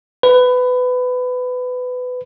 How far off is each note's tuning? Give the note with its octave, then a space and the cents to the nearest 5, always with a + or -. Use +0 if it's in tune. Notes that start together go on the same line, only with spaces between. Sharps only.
B4 +20